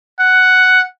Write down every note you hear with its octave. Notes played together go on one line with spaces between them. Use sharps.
F#5